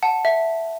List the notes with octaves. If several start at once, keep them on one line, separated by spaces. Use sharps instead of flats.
F#5 A5
E5